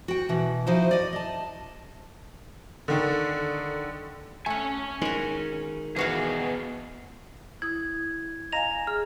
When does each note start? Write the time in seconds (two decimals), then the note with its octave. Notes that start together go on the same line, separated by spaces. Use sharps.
0.08 F#4 G5
0.29 B2 E3
0.66 F3 D#4 E4 F#4 C5
0.91 D5 D#5
1.13 D#5 A5
2.88 D3 D#3
4.46 A3 C#4 F#5 G#5
5.02 D#3 G#3 F#4
5.96 B2 E3 A#3 F#4 G#4 E5 F5
7.62 E4 D#6 G#6
8.52 D#5 F5 G#5 A#5 A#6 F7
8.87 G#4 F6